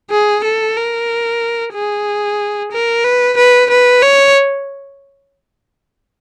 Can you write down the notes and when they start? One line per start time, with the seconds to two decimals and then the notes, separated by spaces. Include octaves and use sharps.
0.11 G#4
0.44 A4
0.76 A#4
1.74 G#4
2.72 A#4
3.04 B4
3.37 B4
3.70 B4
4.02 C#5